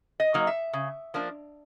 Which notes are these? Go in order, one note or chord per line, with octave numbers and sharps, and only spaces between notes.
D#5
F#3 A#3 D#4
E5
C#3
F3 A#3 D4